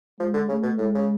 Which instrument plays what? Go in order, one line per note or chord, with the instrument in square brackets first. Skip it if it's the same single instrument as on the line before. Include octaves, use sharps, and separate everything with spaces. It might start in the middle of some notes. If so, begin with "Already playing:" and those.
[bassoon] F3 [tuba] G#3
[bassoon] D3
[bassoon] C#3 [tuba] A3
[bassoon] B2
[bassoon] A2 [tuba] G#3
[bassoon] C#3